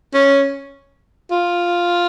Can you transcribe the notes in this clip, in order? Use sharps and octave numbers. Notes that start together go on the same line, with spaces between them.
C#4
F4